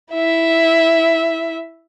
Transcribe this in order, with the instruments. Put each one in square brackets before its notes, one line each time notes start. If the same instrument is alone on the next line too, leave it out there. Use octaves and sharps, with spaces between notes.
[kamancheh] E4 E5